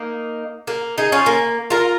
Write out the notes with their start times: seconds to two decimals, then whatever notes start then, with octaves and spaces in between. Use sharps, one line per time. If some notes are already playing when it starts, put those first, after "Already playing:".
Already playing: A#3 D#4
0.67 A#3
0.98 D#4 G#4
1.12 C#4 F4
1.26 A#3
1.70 F4 A#4